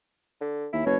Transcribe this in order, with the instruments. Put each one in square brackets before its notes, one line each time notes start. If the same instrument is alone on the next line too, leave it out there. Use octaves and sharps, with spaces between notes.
[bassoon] D3
[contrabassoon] D#2 [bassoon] E4
[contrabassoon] F#1 [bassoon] B2 [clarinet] C#5